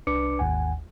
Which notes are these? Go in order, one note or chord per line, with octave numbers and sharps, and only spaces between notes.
C2 D4 B4 D6 C#7
G#1 D#2 F#5 G#5